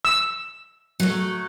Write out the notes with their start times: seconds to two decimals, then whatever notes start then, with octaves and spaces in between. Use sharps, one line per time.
0.05 E6
1.00 F#3 A3